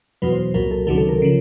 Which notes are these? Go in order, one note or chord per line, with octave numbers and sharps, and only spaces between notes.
E2 B2 F#3 B4
C5
C2 A#2 F#3 A#4
A4
C#2 C3 D#3 F#3 A4
A4
A#4
C#3 F3